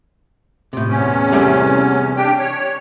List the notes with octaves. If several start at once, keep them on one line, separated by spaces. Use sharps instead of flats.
A2 C3
E2 C#4
C3 G3 A3
D4 G4 G5
C#5